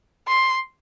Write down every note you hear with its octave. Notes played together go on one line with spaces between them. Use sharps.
C6